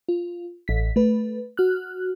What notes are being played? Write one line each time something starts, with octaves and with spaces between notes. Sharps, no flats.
F4
A1 B6
A3 B4
F#4 F6 F#6